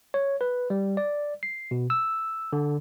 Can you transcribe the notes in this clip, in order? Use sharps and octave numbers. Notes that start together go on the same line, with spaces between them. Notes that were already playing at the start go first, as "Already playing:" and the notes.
C#5
B4
G3
D5
C7
B2
E6
D3